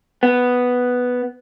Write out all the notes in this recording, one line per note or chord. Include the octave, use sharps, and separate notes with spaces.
B3